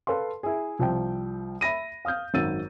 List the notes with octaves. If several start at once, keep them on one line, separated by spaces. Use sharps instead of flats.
A4 B4 F5 C6
E4 G#4
C2 F3 G3 G5
E5 B5 A#6 D#7
F5 D#6 F6 G6
G#1 F#2 D#3 E6 A6 D#7